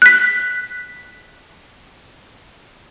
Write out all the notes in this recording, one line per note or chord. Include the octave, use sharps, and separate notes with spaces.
F#6 B6